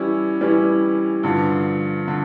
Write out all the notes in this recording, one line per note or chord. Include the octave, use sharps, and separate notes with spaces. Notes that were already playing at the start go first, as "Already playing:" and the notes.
Already playing: E3 G3 C#4 E4
E3 G3 C#4 E4
G2 D3 F3
D3